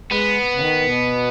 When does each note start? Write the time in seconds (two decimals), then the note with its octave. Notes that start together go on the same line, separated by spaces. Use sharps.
0.11 G#3 B3
0.54 C#3
0.60 D#3
0.81 G#2
0.85 B2